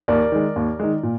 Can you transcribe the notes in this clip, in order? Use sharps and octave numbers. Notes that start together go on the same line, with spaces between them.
D#2 A#4 D5
D#3 G#3
D#2
D#3 G#3
A#2